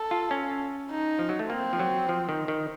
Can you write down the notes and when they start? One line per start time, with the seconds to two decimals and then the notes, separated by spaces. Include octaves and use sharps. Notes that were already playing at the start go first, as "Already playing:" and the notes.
Already playing: A4
0.11 F4
0.31 C#4
0.91 D#4
1.19 F3
1.29 F#3
1.39 A3
1.50 A#3 C4
1.73 F3
1.79 F#3
2.09 F3
2.29 D#3
2.48 D#3